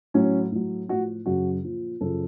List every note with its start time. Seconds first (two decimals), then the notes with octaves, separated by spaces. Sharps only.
0.14 A2 F#3 C#4
0.52 A2 F#3
0.89 A2 F3 F#4
1.26 F#2 C#3 F#3 F#4
1.63 A#2 F3
2.01 F#2 C#3 F3 A4